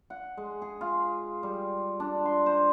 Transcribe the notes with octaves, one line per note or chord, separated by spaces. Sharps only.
F#5
G#3
G#4
F4
G3
D4
C6
C5